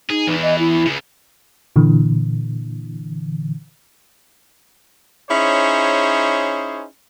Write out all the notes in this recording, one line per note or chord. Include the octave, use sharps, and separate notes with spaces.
D#4 G#4
E2 E3
D#5
E4
C#2 C#3
A#2 D3 E3
C#4 D#4 E4 G#4 C5 C#5